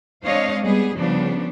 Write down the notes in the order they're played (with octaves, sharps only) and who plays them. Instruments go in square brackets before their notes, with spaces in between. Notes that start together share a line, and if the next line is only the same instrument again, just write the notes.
[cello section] G#3 C4 D4 C#5 D#5 F5
G3 B3 G#4
C#3 F3 G3 B3 D4